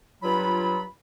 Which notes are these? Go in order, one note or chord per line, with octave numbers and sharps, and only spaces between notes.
G2 F#3 F4 B5